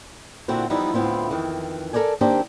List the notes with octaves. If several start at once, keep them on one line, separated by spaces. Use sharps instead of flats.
A#2 D3 C4 E4 F#4
E3 F3 G3 B3 D#4 E4
D2 A2 B3 C4 E4 F4
F2 D#3 E3
A4 A#4 C5 D5 G#5
D#3 A#3 C4 D4 G4 C5